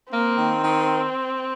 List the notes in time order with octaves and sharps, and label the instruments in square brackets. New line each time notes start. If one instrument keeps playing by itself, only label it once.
[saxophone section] A#3 [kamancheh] C4
[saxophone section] D#3
D#3